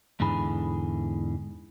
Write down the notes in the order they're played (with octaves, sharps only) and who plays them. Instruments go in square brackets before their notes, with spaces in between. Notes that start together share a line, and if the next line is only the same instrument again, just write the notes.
[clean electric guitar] E2 G#2 D3 E3 G#4 B5